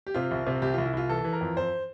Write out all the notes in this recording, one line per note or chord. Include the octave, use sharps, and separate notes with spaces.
G4
C3 F4
C2
C3
C2 G4
C2 F4
E4
C2 F4
E3 A4
E3
A#4
F2
F2 C5